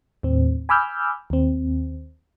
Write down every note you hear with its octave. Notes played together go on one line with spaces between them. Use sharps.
D#2 A2 C4
G#5 B5 D6 E6 F6 G6
D#2 C4